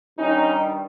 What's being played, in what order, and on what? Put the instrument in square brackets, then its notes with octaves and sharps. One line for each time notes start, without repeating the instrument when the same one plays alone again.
[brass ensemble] G2 D#3 G3 C#4 D#4